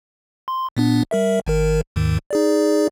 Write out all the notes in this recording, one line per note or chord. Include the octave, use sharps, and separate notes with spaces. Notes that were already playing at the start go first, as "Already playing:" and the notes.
C6
A#2 B3 D4
G3 A#4 E5
G#1 D#3 A#4
D#2 G#2 D#3
D#4 G#4 D5